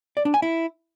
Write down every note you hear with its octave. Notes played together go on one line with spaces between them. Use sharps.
D5
D4
G#5
E4